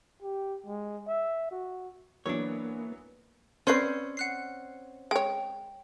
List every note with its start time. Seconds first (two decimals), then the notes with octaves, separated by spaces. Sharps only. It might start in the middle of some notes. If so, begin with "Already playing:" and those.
0.22 G4
0.66 G#3
1.07 E5
1.51 F#4
2.26 E3 F#3 A#3 B3 D4 C#5
3.67 C4 C#4 B4 C5 D5 G6 C7
4.17 F#5 F#6 C7
5.11 G#3 C#5 G5